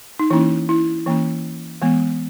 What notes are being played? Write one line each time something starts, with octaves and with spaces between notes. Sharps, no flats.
D#4
E3 A#3 C#4 E4
E4
E3 A#3 C#4
E3 G#3 B3